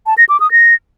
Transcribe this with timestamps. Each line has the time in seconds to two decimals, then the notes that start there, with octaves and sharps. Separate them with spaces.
0.06 A5
0.18 A#6
0.29 D6
0.40 D#6
0.52 A#6